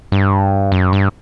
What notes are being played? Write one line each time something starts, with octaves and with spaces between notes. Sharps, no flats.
G2
F#2
G2